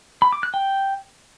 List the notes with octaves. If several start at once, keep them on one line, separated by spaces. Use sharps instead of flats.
B5
D6
F#6
G5